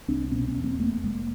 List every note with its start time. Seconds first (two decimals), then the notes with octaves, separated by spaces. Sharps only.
0.08 C2 C4 D4
0.32 B2 B3 C#4
0.48 B3 C#4
0.56 E2
0.64 A#3 C4
0.80 F1 A3 B3
1.04 F1 G#3 A#3